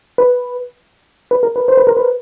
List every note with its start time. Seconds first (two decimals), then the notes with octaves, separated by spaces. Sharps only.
0.18 B4
1.31 B4
1.43 A#4
1.56 B4
1.68 C5
1.77 B4
1.87 A#4
1.97 B4